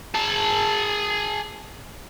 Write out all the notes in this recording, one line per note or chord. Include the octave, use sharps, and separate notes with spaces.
G#4 A5